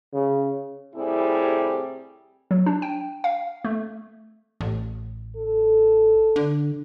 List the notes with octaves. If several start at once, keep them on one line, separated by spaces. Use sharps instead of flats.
C#3
A2 C3 G3 C4 E4 G#4
F#3
D4
G5
F5
A3
A1
A4
D3